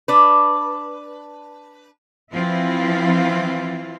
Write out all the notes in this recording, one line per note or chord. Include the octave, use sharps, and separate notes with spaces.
D4 B4
E3 F3 C4 E4 F4